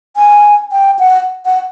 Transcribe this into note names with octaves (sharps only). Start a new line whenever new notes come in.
G#5
G5
F#5
F#5